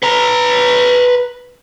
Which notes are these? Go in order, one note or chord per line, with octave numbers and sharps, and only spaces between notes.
B4 A#5